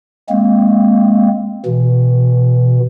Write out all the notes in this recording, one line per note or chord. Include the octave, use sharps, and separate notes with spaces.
G#3 A#3 C4
B2 E3